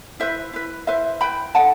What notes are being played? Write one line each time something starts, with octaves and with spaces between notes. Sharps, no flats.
E4 B4 C5 E5
E4 B4
E4 B4 C5 E5
E4 B4 G5 B5
D#4 A4 F#5 A5